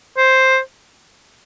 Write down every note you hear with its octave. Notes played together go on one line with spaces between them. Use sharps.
C5